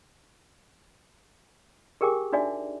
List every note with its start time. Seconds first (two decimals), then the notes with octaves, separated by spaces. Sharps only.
2.01 G4 G#4 A#4 G5 G#5 D6
2.33 D4 D#4 F#4 D5 E5 G#5